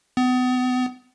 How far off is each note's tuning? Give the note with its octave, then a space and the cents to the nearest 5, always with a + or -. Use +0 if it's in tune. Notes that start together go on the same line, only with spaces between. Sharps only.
B3 +35